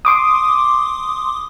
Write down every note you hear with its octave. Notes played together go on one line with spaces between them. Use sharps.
C6 D6 D#6